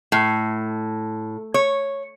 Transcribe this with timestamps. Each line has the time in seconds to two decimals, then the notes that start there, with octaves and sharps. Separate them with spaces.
0.12 A2
1.54 C#5